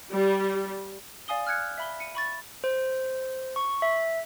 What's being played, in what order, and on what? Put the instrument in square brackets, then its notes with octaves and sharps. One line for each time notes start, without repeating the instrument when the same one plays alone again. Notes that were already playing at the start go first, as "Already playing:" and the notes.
[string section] G3
[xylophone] D5 F5 G#5 D#6 G7
F6 F#6 G#6 C#7
E5 B5 G7
C#7 D#7
B5 C#6 A6
[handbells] C5
C#6
E5